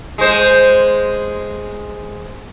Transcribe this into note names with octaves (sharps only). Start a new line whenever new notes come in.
G#3 C5